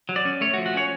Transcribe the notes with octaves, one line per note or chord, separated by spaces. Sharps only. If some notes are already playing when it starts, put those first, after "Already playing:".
F#3
D5
C#4
A3 C#5
F#4
F3
F#4
C#4 C#5